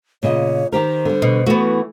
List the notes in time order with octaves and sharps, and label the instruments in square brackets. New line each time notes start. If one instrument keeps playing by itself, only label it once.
[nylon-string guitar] A#2 C#3 D#5 [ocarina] C#5
[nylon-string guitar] D#3 G4 A#4 [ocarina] C5
[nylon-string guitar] D3 G3
[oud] B2
[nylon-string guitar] E3 A3 [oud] B3 F#4